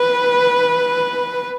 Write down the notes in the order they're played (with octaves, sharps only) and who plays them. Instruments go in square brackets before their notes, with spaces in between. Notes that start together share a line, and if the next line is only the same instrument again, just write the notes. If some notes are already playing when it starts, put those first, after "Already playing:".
Already playing: [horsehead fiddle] B4